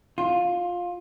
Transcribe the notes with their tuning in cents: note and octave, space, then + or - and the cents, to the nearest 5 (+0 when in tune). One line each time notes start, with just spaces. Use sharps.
F4 +15